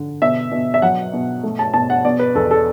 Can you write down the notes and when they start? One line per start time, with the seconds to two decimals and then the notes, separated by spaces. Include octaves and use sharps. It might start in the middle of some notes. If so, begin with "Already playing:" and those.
Already playing: D3
0.22 B2 E5
0.51 B2
0.74 E5
0.82 F#3 F#5
1.14 B2
1.43 A3
1.59 A5
1.74 B2 A5
1.90 F#5
2.05 B2 D5
2.19 B4
2.35 E2 A4
2.51 A4